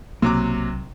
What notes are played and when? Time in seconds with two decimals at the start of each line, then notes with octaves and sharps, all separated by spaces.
0.22 B1 C3 F#3 A#3 D6